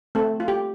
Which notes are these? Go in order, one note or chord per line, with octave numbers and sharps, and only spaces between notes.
A3 C4 A4
F4
G4